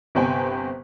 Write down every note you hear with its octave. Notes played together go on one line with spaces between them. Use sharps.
G1 C3 B3 C5 G5 G#5